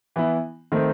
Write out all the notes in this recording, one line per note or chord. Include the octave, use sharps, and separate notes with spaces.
E3 B3 E4
D#3 A3 C4